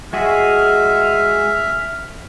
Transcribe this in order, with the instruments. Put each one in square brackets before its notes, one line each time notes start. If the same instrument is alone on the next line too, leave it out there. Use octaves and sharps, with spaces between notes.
[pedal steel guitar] G#3 F#4 G#4 [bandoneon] E5 [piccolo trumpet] F6